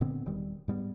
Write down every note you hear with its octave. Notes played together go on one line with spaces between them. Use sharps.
A#2 D3 B3 C4
E1 D#3 G3
G#2 G3 B3